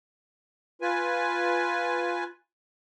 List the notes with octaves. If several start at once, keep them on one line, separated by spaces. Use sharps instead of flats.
F4 B4 G#5